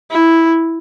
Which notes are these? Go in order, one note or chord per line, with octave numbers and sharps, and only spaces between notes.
E4